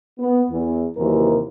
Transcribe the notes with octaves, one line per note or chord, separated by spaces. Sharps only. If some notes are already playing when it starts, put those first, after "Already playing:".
B3
E2
D#2 C3 E3 F#3 A#4